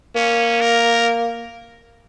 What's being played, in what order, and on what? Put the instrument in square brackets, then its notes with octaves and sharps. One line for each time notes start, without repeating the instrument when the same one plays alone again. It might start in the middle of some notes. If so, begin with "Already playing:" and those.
[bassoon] A#3 [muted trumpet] C#4
[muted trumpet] A#4